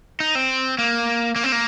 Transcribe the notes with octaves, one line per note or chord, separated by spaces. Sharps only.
D#4
C4
A#3
A#3
C4
A#3